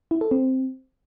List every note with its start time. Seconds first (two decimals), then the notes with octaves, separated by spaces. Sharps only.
0.11 E4
0.21 A4
0.31 C4